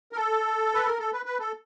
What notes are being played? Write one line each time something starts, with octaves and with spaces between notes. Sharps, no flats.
A#4
A4
B4
A#4
A4
B4
B4
A4